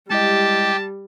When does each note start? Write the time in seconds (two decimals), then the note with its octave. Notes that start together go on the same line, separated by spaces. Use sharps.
0.10 G3 G#3 E4 G4 D#5 A5